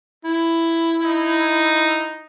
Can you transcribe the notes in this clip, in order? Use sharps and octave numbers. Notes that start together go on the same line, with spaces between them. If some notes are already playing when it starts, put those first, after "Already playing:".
E4
D#4